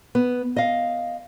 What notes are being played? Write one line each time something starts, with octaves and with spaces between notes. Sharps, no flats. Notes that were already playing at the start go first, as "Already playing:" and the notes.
B3
D#5 F5